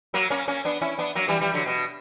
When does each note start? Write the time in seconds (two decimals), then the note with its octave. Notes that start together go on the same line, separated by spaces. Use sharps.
0.14 F#3 A#3
0.30 A#3 C#4
0.48 A#3 C#4
0.65 B3 D4
0.82 C#4 E4
0.98 B3 D4
1.15 F#3 A#3
1.28 E3 G3
1.41 E3 G3
1.54 D3 F#3
1.66 B2